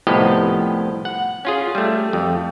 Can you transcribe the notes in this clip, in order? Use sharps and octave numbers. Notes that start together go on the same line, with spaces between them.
C2 A2 F3 B3 G4 D#5
F#5
C#4 F4 G#4
G3 A3
F2